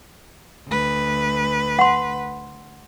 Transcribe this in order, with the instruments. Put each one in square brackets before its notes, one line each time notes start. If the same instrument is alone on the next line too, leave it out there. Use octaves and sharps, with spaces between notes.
[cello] D2 B4
[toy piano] F#5 C6